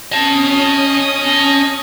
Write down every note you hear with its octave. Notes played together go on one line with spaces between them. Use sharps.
C#4 D#5 A5 D#6